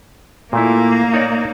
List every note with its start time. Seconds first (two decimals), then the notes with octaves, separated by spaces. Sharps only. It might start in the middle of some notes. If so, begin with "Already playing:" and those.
0.53 A#2 A3 A#3 E4
1.14 D#4 C#5 D5